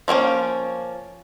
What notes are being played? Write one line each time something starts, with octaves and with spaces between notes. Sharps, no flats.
F3 A#3 C4 C#4